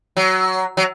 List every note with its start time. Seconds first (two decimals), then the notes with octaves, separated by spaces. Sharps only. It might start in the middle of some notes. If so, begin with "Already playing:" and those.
0.17 F#3
0.77 F#3